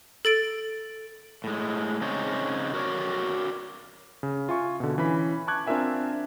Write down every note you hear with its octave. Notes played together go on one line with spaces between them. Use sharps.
A4 A6 D7
A2 G#3
C#3 C4 D4 D#4 G#4 C#5
F#4 A#4 C#5 D5
C#3
F4 E5 G#5 C#6
B2 D3
E3 C#4 B5 B6
A5 C#6 D6 F#6 G#6
C4 D4 F4 A#4 E5 G#5